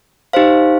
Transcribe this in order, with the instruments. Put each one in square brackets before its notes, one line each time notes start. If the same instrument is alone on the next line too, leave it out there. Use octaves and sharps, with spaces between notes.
[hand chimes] D#4 G4 C5 F5